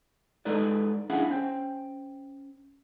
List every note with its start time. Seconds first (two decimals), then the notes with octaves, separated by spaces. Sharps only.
0.45 G#3 D#4 A4 B4 D5
1.10 C#4 D4 E4 G#4 F5 F#5
1.30 C#4 C5 G5